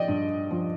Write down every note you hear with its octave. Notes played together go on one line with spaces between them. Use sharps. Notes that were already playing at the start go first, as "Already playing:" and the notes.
Already playing: F3 D5 D#5 G5
G2
F3